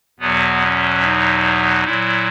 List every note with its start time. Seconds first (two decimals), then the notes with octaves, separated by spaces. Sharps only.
0.20 E2 B2 F#3 B3
0.62 C#4
1.03 D#4
1.84 A#2 F#3 E4